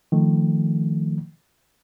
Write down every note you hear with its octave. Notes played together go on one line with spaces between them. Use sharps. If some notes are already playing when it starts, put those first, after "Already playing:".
D#3 F3 A3